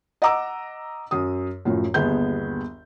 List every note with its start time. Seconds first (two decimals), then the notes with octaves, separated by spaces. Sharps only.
0.22 D#5 F#5 A#5 D6 E6
1.11 F#2 D#6
1.65 F#2 A2 F3
1.94 G1 D#2 B3 G#4 G6